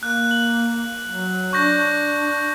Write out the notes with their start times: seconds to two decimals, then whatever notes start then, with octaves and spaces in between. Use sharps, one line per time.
0.03 A#3 F#6
0.31 F#7
1.08 F#3
1.53 D4 C#6 G6 A#6